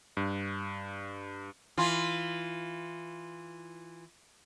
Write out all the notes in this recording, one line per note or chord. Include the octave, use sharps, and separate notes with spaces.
G2
E3 F4